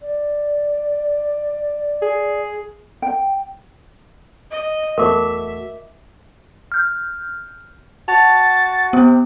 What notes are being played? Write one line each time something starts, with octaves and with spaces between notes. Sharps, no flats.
D5
G#4
G5
D#5
E2 A3 F#4 A#4 E5 D6
F6 G6
F#4 A5 A6
C3 B3